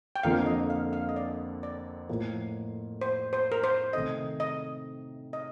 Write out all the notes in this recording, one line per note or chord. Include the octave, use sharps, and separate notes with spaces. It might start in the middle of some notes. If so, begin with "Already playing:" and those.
G5
F2 D3 F3 A#3 F5
D#5
F5
F5
D#5
D5
D5
A2 F3 A#3
C5
C5
A#4
C5
C3 D#3 A3 D#5
D#5
D#5